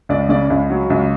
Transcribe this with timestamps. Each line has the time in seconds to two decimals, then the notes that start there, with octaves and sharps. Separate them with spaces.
0.09 C#2 D5
0.29 C#3 D5
0.50 C#2
0.70 F#3
0.90 C#2